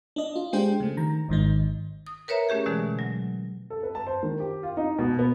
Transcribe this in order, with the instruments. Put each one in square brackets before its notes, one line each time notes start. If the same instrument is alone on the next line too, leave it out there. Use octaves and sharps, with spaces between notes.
[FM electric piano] D4 D#5
F4
G#3 D4 G4 G#4 C5 G5
C#3 A3
D#3 A#5
G#1 G#2 D#3 D#4
[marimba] D#6
A#4 B4 C#5 E5 A#5
A3 C#4 G4 G#4
B2 D3 E3 G#3
F#3
[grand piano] A4
B4
A5
C5
D#3
G4
F4
D#4
B2
B3